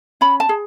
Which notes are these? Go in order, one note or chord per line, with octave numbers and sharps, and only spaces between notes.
C#4 B5
A5
G#4